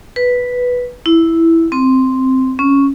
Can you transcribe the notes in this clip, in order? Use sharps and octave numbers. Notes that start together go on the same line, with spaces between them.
B4
E4
C4
C#4